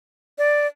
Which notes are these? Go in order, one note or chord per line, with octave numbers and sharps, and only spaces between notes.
D5